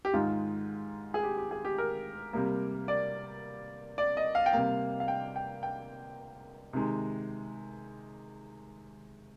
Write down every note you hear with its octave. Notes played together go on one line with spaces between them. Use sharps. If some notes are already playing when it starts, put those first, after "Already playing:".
G4
G#2 D#3 G#3 F4
G#4
G4
G4
G#4
G4
A#4
C3 G3 A#3
D5
D5
D#5
F5
G5
C3 G3 A#3 F5
F5
G5
G5
G5
C3 D#3 G#3